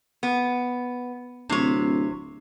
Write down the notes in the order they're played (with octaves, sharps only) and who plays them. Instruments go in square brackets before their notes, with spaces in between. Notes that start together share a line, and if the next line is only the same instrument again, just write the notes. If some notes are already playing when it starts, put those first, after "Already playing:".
[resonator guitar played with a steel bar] B3
[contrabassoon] D1 [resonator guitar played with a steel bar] C3 C#5